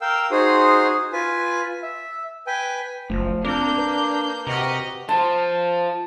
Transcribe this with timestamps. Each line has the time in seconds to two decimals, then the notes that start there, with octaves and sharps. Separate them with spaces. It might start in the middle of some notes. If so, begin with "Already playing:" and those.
0.01 A#4 F5 G5 E6
0.31 D#4 F#4 G#4 C5 C6 D#6
1.13 F4 B4 G#5
1.83 E5
2.47 B4 G5 G#5
3.10 F#1 F3 A3
3.45 A#3 C4 D4 A#4 G6
3.78 B4
4.47 C3 F#4 G4 A#4 D#5
5.09 F4 C5 A5